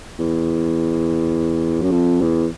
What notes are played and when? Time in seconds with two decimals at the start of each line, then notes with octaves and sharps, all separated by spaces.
0.19 E2
1.82 F#2
1.91 F2
2.21 E2